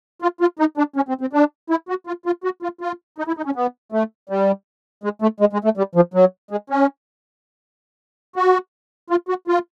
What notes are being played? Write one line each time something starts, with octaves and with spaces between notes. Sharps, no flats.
F4
F4
D#4
D4
C#4
C4
C4
D4
E4
F#4
F4
F4
F#4
F4
F4
D#4
E4
D#4
C#4
B3
A3
G3
G#3
A3
G#3
G#3
A3
G3
F3
F#3
G#3
C#4
F#4
F4
F#4
F4